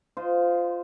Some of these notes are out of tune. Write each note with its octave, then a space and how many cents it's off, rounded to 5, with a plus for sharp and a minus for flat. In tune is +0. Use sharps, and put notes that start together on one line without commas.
F4 +0 C5 -20 D#5 +0